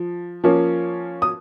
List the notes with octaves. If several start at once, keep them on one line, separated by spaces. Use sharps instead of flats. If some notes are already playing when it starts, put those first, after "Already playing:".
Already playing: F3
F3 A#3 C#4
D#6